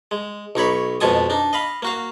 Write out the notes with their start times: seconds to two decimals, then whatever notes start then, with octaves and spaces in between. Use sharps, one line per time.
0.11 G#3
0.55 B1 D#4 C#5 B5
1.01 F2 B2 G#3 A4 G#5 D#6
1.30 D4 D#4
1.53 D#5 F5 B5
1.82 A#3 F#4 F5